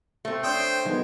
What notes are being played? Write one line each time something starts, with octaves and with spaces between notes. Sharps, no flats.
A3 C4
D4 C5 C#5 G5 D#6
D#3 F#3 G#3 B3